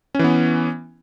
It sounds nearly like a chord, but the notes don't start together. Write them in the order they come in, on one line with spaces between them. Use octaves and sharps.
C#4 E3 B3